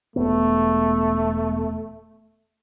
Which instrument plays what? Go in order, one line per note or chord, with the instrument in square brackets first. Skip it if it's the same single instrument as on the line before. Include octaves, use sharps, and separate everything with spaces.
[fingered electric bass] E1 B3 [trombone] A3